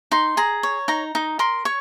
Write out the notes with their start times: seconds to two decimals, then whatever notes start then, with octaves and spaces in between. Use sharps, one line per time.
0.11 D#4 C6
0.37 G#4 A#5
0.63 C#5
0.88 D#4 A#5
1.15 D#4
1.39 A#4 C6
1.65 C#5 C#6